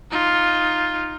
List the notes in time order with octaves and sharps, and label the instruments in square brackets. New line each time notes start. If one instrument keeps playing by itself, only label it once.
[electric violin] D#4 F4